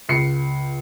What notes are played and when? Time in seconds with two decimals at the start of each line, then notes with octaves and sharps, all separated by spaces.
0.09 C#2 C7 C#7